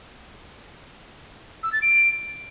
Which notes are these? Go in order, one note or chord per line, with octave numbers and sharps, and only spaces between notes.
E6
A6
D7